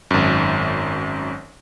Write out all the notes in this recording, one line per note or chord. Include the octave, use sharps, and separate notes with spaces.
G#1 F#2